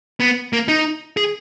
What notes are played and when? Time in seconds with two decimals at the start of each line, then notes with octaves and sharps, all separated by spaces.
0.20 B3
0.53 A#3
0.68 D#4
1.17 G#4